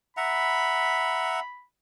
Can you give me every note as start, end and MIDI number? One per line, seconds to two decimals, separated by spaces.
0.17 1.40 76
0.17 1.40 78
0.17 1.40 82
0.17 1.66 83